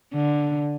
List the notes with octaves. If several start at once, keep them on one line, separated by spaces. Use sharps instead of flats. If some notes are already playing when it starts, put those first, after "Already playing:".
D3